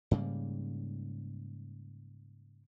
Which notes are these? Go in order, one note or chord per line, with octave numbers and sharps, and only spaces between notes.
G#2 C#3 G3 A#3